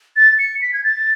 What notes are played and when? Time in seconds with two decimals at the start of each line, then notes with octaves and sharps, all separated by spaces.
0.16 A6
0.39 C#7
0.62 B6
0.73 G#6
0.84 A6